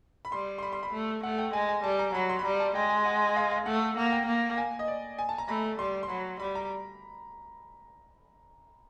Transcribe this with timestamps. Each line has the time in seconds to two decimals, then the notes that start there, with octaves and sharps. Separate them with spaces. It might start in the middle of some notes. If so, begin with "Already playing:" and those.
0.25 B5
0.32 G3 C6
0.58 C6
0.63 B5
0.73 C6
0.83 B5
0.92 A3
1.23 A3 F#5
1.38 G5
1.53 G#3 G#5
1.69 G#5
1.84 G3 A5
1.99 A#5
2.14 F#3 B5
2.29 C6
2.39 B5
2.45 G3 A#5
2.60 A5
2.75 G#3 G5
2.90 G#5
3.05 F#5
3.36 F5
3.51 F5
3.66 A3 F#5
3.97 A#3 F#5
4.12 G5
4.27 A#3
4.58 G#5
4.79 D#5
4.88 D5
5.19 G#5
5.29 A5
5.38 A#5
5.48 A3 B5
5.78 G3 C6
6.03 C6
6.09 F#3 B5
6.40 G3 B5
6.55 A#5